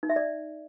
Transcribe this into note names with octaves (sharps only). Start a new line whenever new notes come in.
D#4
E5
D5